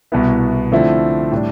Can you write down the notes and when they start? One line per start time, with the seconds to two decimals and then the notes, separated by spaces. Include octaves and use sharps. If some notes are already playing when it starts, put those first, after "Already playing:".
0.12 C2 B2 B3 E4
0.72 D3 F3 A3 C4 E4
1.32 A2 G3 D4